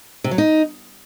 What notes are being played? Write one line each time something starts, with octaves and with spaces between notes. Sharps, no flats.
C3
F#3
D#4